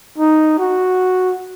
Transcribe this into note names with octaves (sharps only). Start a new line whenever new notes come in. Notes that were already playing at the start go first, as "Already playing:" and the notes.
D#4
F#4